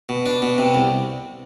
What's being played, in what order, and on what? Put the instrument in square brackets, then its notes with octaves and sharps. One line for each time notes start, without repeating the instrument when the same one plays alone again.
[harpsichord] B2
D4
B2
C3
C2